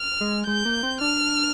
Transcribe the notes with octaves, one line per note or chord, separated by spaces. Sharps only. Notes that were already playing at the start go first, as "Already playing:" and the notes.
Already playing: F6
G#3
G#3 G6
A#3
C4
D4 F6